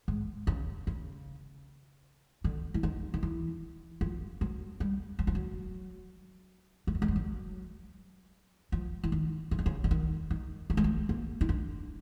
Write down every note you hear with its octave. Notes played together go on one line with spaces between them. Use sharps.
G#2
C#3
C#3
D3
E3
D#3
D#3
E3
F3
F#3
G3
F#3
F3
F#3
A#3
A3
G#3
G3
F#3
F3
E3
D#3
C#3
D3
C#3
D3
D#3
D#3
A3
G#3
A3
A#3
D#4
D4